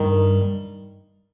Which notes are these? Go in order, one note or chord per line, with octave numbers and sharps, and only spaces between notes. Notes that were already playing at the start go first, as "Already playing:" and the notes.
Already playing: G2 D#3 G3